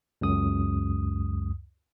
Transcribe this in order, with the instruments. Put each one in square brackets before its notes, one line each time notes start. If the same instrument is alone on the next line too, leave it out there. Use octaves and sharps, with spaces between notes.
[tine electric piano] C#2 F#2 D#6